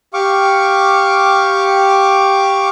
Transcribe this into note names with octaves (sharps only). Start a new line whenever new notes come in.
G4 F5 C#6 D6